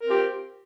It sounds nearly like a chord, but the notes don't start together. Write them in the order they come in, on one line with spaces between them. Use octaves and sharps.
A#4 C4 G4 F4